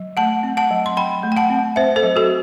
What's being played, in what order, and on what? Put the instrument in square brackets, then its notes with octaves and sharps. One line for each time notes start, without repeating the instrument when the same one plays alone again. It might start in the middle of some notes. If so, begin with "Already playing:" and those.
Already playing: [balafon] F#3
A3 F#5 A5
C4
F#5 A5
F#3
C6
F#3 G5 B5
A3
G5
F#5 A5
C4
C4 C5 E5
A4 C5
F#3
F#4 A4